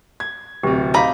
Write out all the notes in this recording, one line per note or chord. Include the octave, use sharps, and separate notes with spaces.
G#6
D1 C3 G4
D#4 F5 A#5 B5 D6